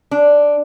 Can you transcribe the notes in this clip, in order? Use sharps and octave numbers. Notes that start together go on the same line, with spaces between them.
D4